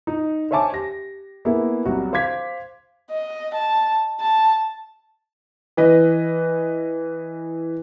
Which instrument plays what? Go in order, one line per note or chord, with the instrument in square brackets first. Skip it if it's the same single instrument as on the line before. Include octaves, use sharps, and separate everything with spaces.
[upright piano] D#4
C5 C#5 E5 G#5 A5 D6
G4 A#6
A#3 B3 E4 G#4
C2 F#3 G3 F#4
C5 F5 D6 G#6 B6
[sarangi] D#5
A5
A5
[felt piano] E3 B4 D#5